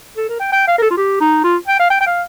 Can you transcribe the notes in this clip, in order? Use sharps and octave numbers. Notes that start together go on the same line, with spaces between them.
A4
A#4
G5
G5
F5
A#4
A4
F4
G4
D#4
F4
G5
F5
G5
G5
F5